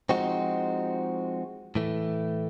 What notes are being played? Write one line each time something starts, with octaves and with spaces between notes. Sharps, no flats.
F3 G#3 C4 D#4 F#4
A2 E3 A3